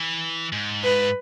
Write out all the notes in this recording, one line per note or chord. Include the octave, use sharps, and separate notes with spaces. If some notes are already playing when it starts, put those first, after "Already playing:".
Already playing: E3
G#2
B4